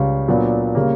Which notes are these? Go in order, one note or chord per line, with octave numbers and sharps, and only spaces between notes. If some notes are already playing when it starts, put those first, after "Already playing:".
Already playing: C#2 C#3 G3
A#2 F#3 B3 D4
C#3 G3 A#3